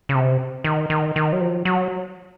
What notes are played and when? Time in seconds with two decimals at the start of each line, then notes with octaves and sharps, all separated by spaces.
0.09 C#3
0.15 C3
0.64 D#3
0.90 D#3
1.16 D#3
1.33 F#3
1.40 F3
1.65 F#3